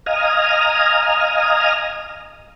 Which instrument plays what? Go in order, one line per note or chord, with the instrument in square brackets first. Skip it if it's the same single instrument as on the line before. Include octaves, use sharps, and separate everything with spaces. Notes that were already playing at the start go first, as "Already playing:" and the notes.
[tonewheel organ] D#5 F5 G#5 A#5 D#6 F6